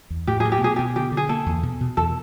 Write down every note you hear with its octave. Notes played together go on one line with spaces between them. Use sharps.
E2
A2 G4
A2 G#4
G4
B2 G#4
B2 G4
D3 G4
D3
G#4
A#3 A4
E2
B2
B2
E2 A4